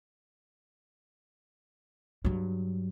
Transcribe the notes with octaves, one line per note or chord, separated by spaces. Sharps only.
G2 F#3